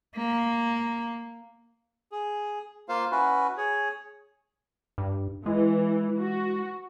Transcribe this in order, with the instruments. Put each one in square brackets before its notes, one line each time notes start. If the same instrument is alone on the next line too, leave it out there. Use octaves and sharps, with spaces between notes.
[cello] A#3
[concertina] G#4
A#3 F4 C5 F5
C#4 E4 F#4 B4
G#4 C#5
[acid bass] G2
[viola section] E3 [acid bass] G#3
[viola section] F#4